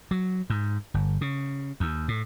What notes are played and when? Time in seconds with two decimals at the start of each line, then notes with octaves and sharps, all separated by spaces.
0.11 F#3
0.50 G#2
0.94 G1
1.21 C#3
1.80 D#2
2.08 A2